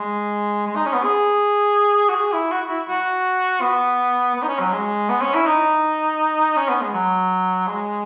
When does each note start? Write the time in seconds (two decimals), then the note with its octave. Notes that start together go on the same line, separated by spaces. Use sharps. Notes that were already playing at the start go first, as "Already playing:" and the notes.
Already playing: G#3
0.67 G#3
0.76 D#4
0.86 C#4
0.94 B3
1.03 G#4
2.09 F#4
2.15 G#4
2.33 E4
2.51 F#4
2.69 E4
2.88 F#4
3.61 B3
4.35 B3
4.43 D#4
4.48 C#4
4.59 F#3
4.72 G#3
5.09 B3
5.22 C#4
5.34 E4
5.47 D#4
6.56 C#4
6.69 B3
6.81 G#3
6.94 F#3
7.67 G#3